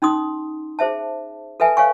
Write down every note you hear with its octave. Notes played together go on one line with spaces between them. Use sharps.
C#4 D#4 C6 D#6
G#4 C5 E5 A5
A4 B4 E5 G#5 A5
C#5 F5 G#5 C#6